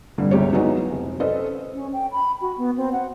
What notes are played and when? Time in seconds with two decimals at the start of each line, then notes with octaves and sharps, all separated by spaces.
0.18 F1 G2 D3 G3
0.31 G1 C#2 G4 C#5
0.53 F#3 G#3 B3 D#4 E4 F#4
0.92 F1
1.20 C#4 A4 B4 C5 D#5
1.74 C#4
1.93 G5
2.12 B5
2.41 F#4
2.58 B3
2.77 C4
2.92 F#5